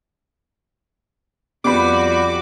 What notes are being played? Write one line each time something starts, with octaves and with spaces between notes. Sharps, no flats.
F2 G3 B3 F#4 B5 D6